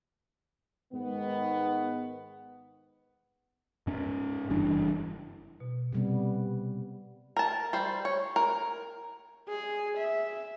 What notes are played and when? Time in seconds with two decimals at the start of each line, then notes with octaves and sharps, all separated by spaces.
0.93 G#2 D#3 B3
3.87 G#2 C#4
4.50 F#1 G2 E3 D4
5.60 B2
5.92 C3 G3 B3
7.36 A#4 A5
7.73 G3 C5
8.05 C#5
8.36 A#4
9.49 G#4
9.98 E5